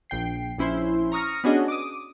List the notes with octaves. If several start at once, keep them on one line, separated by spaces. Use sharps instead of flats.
A#1 G5 C7
A#1 C#4 E4 C5 C6
A#5 C#6 D#6 F6 A#6
B3 C#4 D4 F#4 G#4 D#5
D6 D#6